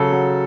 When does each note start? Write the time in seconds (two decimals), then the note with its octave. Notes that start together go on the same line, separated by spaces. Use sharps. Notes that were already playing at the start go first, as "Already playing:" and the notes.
Already playing: C#3 F#3 A4
0.12 F#3